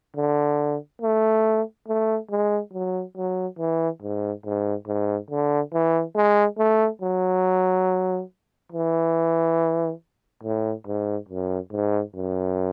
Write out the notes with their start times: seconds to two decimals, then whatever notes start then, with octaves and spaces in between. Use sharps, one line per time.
0.16 D3
1.02 A3
1.88 A3
2.30 G#3
2.73 F#3
3.17 F#3
3.59 E3
4.02 G#2
4.45 G#2
4.87 G#2
5.30 D3
5.73 E3
6.16 G#3
6.58 A3
7.01 F#3
8.72 E3
10.43 A2
10.87 G#2
11.29 F#2
11.72 G#2
12.15 F#2